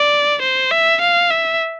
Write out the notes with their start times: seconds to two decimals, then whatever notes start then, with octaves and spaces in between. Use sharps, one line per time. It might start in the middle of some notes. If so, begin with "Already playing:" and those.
Already playing: D5
0.42 C5
0.71 E5
1.01 F5
1.30 E5